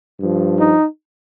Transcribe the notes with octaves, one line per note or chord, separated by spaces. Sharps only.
G2 F3
D#4